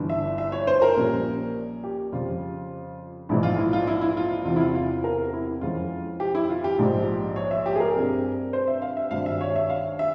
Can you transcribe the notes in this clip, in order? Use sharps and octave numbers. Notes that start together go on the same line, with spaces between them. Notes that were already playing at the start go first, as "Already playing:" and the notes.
Already playing: G1 G2 E3
E5
E5
C#5
C5
A#4
A#1 A#2 G3 C#4
G4
F2 C#3 G3 F4
A#1 G#2 E3 E4
F4
E4
F4
E4
E4
F4
E2 C3 E3 F4
E4
F4
F4
A#4
E4
F2 E3 G#3 C#4 F4
G4
E4
F4
G4
A#1 G#2 F3
C#5
E5
G4
G#4
A#4
G2 G3 C4
C5
E5
F5
E5
G#1 G2 G3 F5
E5
C#5
E5
F5
E5